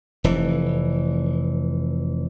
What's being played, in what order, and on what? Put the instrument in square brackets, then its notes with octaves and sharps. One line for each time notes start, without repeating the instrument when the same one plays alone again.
[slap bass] F1 E3